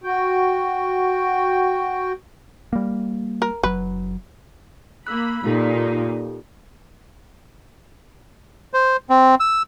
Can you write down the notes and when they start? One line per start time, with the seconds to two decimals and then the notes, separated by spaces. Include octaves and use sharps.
0.04 F#4 G5
2.73 G3 A#3
3.42 A#4
3.63 F#1 F#3 B4
5.07 A#3 B5 E6 F#6
5.45 A#2 D#4 F4 G4 A4
8.74 C5
9.10 C4
9.40 E6